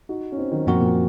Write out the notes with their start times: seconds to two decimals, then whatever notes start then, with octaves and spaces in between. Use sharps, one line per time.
0.09 D#4 F#4
0.32 C#4
0.37 C4 D#4
0.52 D#3 F#3
0.67 F#2 A#2 F3 C4 F#4 A#4
0.81 A#2